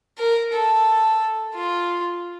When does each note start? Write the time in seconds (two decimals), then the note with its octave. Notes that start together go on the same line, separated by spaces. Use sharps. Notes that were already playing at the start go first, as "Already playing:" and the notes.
0.19 A#4
0.54 A4
1.55 F4